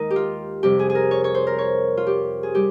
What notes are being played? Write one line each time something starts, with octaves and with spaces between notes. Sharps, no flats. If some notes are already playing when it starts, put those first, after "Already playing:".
Already playing: D#2 D#3 G#3 D#4 A#4
G4
F4
F2 C3 G3 C4 G4
G#4
G#4
A#4
C#5
C#5
C5
A#4
C#5
F4
G4
G#4
G3 G4